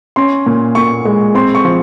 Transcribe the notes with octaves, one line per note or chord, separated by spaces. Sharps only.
C#4 C6
A#2
A#2 C#6
G#3
C4 C6
C#6
F3